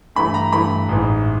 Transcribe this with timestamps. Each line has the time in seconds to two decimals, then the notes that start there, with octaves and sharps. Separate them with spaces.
0.15 G2 E3 A3 B5
0.34 A#5
0.52 G2 E3 A3 B5
0.89 A1 G#2 E3